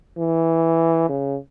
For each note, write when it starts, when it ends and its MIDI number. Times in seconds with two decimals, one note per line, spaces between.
0.18 1.09 52
1.09 1.37 49